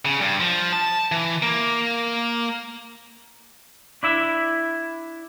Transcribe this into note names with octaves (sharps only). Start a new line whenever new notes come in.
C#3
G2
F3
A5
E3
A#3
D4 E4 E5